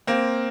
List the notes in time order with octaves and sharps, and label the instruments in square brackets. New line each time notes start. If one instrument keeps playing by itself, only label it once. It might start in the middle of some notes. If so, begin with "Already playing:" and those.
[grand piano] A#3 C4